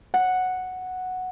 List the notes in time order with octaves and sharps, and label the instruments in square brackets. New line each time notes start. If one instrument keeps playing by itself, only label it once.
[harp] F#5